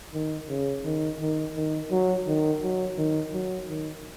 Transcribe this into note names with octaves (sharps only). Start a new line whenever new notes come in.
D#3
C#3
D#3
D#3
D#3
F#3
D#3
F#3
D#3
F#3
D#3